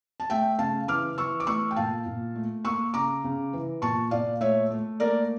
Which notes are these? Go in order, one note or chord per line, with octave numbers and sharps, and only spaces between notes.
A5
A3 E5 G5
C#3 F5 A5
E3 D6 F6
E3 C#6 E6
D6
A3 C#6 E6
G5
A#2 F5 A5
A#2
A3
A#3 C#6 E6
C#3 A#5 D6
C#3
E3
A#2 A5 C#6
A#2 D5 F5
A3 C#5 E5
A3
A#3 A#4 D5